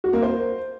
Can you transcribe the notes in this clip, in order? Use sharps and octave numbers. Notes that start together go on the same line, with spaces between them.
F#4
A#3
C5